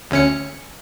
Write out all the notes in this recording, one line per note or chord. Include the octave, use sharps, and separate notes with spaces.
D2 C#4 C#7